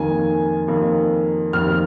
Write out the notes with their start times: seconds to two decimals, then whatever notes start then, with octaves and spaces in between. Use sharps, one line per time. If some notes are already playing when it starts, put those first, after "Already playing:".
Already playing: F2 D#3 A#3 G#5
0.68 F2 D#3 A#3
1.53 F2 D#3 A#3 F6